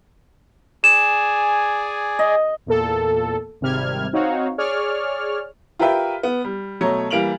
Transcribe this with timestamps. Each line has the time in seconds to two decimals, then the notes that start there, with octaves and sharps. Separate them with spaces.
0.84 G#4 D5 G#5 E7
2.19 D#5
2.66 E2 A#2 A4
3.61 G#1 C3 G3 F6 G#6
4.13 C4 D#4 F#4 C#5 F5
4.58 G#4 C#5 D5 F6
5.79 F4 G4 A#4 B4 E5 G5
6.23 B3
6.44 G3
6.81 B2 F#3 A3 C#5 A#5
7.11 E3 G3 A#3 D7 F7 F#7